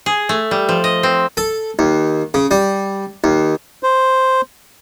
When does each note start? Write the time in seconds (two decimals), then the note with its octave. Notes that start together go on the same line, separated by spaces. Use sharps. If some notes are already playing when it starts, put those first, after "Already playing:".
0.06 G#4
0.29 A3
0.51 G3
0.69 F3
0.84 D#5
1.03 C4
1.37 A4
1.79 D#2
2.34 C#3
2.51 G3
3.24 D#2
3.83 C5